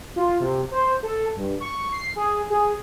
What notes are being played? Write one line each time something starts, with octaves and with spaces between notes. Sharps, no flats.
F4
C3
C5
A4
G2
C#6
C7
G#4
G#4